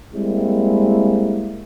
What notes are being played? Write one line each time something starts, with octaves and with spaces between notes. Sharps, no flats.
G3 G#3 A#3 C4 E4